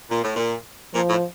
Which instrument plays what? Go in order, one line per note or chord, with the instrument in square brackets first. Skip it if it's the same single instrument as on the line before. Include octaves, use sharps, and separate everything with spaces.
[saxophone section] A#2
A2
A#2
[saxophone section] A#2 [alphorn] F3
[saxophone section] A2